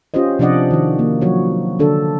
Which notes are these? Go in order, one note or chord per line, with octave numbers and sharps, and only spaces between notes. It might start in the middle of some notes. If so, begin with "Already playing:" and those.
C#4 F4 G4 C5 D#5
C3 F3 D4 D5 D#5 F#5
D#3 F#4
A#3
F3 F#3 F#4 C#5
D3 D4 A4